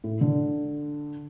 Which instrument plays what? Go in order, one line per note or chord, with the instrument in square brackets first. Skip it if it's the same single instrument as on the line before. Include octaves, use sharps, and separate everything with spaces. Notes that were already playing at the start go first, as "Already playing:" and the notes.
[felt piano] A2
D3